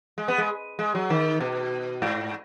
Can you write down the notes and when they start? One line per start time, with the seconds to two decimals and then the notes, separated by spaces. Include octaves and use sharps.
0.18 G#3
0.28 B3
0.38 G#3
0.79 G#3
0.95 F#3
1.10 D#3
1.40 B2
2.02 G#2